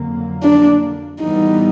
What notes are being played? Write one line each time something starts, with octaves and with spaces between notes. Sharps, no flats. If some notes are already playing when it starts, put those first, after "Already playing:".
Already playing: F2 D3 F#3 A#3
D4
A2 E3 G3 B3 D#4